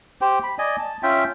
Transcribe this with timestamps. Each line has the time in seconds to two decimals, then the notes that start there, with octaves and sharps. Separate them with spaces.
0.21 G4 C5 G5
0.43 B5
0.58 D5 D#5 G#5
0.79 A5
1.03 C#4 F4 E5 G5